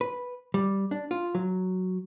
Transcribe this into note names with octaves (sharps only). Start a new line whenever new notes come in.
B4
G3
D4
F4
F#3